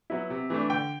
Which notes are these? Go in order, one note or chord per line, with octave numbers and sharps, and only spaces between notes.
F#3 B3 E4
C3
E3 A3 D4
D3 G5